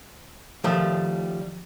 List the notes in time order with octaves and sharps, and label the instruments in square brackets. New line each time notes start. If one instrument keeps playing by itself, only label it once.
[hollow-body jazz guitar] D#3 F3 G3 A3